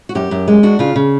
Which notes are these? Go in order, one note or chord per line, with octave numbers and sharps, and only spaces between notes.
F#4
F#2 G4
F#2
G#3
D4 F#4
C#3 F4
C#3